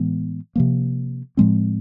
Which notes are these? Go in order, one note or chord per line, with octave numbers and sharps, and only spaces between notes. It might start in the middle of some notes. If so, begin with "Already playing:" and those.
Already playing: A2 E3 G#3 B3
C3 F3 A#3
A2 F3 G#3 C4